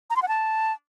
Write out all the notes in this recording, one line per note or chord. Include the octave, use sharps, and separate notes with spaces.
A#5
C6
F#5
A5